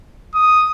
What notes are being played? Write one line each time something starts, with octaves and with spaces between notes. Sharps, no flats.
D#6